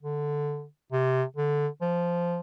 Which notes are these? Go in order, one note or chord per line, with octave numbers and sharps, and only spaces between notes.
D3
C3
D3
F3